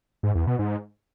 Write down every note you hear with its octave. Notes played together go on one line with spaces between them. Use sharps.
G#2
E2
B2
G#2